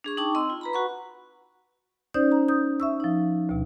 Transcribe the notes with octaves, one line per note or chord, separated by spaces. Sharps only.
D4 G#4 C#6
D#4 G5 A5 C#6 D6
C4 D#5 C6 E6
F4
B4 A#5 B5
F#4 F#5 C#6
C#4 D#4 C5 D5 D#6 G6
A#5
D#6 G6
E5 C#6 E6
F3 D#4
D2 B2